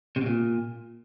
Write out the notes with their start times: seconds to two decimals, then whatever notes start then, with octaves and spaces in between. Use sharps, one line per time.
0.16 C3
0.21 B2
0.26 A#2